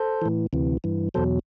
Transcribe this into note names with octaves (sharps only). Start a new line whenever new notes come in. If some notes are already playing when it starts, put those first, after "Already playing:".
Already playing: A4 C5
A2 E3
D2 C3 E3
G2 E3
E2 B2 F#3 A4 C5